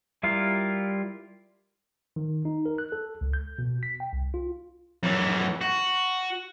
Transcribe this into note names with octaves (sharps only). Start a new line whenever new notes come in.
G3 E4 F4 A#4 F5
D#3
D#4
A#4
F#6
A4
C#2
G6
B2
B6
G5
C2
F4
F#2 E3
F#4